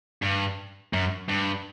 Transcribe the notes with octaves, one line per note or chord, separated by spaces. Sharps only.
G2
F#2
G2